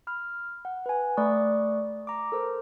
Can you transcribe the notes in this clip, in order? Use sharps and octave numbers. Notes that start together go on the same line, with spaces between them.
B5 F6
F#5
B4 G#5
A3 D5 B5 C#6 D#6 F#6
A#5 D6
A4 A#4 C5